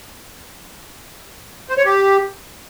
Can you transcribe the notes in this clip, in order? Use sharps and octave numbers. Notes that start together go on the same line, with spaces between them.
C5
C#5
G4